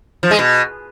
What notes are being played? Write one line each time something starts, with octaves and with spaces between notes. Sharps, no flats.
F3
G#3
B2